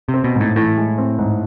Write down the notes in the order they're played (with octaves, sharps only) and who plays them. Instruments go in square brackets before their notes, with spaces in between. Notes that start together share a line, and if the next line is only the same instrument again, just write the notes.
[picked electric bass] C3
[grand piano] C4
[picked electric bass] B2
[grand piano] G#2
[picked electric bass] A2
[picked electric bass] A2 [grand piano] E3
[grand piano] G#3
C4
G#2